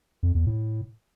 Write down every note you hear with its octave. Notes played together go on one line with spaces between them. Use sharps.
F2
E2
A2